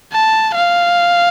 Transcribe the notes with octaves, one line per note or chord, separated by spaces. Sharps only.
A5
F5